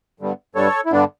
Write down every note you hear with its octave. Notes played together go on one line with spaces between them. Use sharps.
G2 D3 G3 B3
G2 D3 G3 B3 A4 C#5
E4
G2 D3 G3 B3 D4